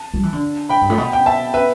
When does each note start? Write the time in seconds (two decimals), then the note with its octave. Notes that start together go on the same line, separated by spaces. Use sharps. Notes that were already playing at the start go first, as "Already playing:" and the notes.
Already playing: A5
0.14 G3
0.23 E3
0.33 D3
0.69 G5 B5
0.81 G2
0.90 A2
0.98 B2
1.13 G5
1.26 E5 A5
1.54 B4 E5